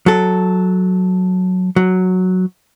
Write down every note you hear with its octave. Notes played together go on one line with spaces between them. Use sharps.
F#3 A4
F#3